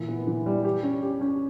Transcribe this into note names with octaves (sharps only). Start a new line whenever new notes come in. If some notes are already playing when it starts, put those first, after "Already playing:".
Already playing: A#2 E3
B3
E3
G3
G4
C#4
G4
C#4